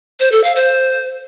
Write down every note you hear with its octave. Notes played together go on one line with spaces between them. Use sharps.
C5
A4
F5
C5